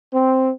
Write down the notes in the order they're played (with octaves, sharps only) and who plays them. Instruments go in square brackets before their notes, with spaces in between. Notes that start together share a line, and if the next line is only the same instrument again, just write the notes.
[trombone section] C4